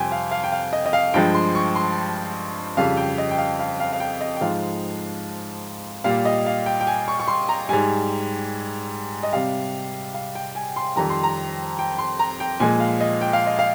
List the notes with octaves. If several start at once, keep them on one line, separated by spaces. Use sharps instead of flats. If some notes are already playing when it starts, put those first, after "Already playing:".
Already playing: F2 C3 G3 G5 G#5 C6
F5
F5
G5
F5
D#5
D#5
F5
G2 F3 G#3 G5
C6
C#6
C6
F2 C#3 G3 F5
G5
D#5
G5
F5
F5
F5
F5
G5
D#5
G5
G#2 F3 G#3 F5
A#2 G3 F5
D#5
F5
G5
G5
G#5
C#6
C#6
C6
A#5
G#2 G3 G#5
D#5
C3 G3 F5
F5
G5
G#5
C6
F2 D#3 G3 A#5
C6
A#5
G5
C6
A#5
G5
A#2 F3 G#3 G#5
F5
D#5
G5
F5
D#5
F5